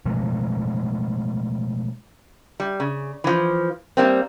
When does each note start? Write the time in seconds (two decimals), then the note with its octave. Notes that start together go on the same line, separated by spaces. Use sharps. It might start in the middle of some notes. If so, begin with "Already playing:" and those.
0.06 B2 F3 G#3 A3
2.60 G3
2.80 C#3
3.24 E3 F3
3.97 G3 A#3 C4